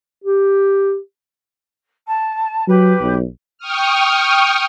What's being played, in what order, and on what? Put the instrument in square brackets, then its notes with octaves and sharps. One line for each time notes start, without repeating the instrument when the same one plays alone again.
[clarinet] G4
[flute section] A5
[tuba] F#3 [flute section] G4 B4
[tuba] B1
[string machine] G5 C#6 D#6 F6